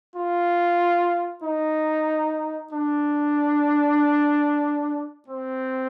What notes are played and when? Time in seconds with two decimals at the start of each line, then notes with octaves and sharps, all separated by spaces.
0.16 F4
1.44 D#4
2.73 D4
5.29 C4